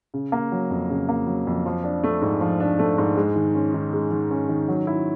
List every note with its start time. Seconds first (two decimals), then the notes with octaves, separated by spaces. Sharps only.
0.14 C#3
0.32 A#3
0.52 F#3
0.71 F2
0.90 C#3
1.09 A#3
1.27 F#3
1.47 F2
1.66 F3
1.84 D4
2.04 A3
2.22 G#2
2.41 F3
2.60 D4
2.79 A3
2.98 G#2
3.17 G#3
3.36 D#3
3.55 C#4
3.74 D#3
3.93 G#3
4.11 D#3
4.31 C#4
4.49 D#3
4.68 F#3
4.87 E4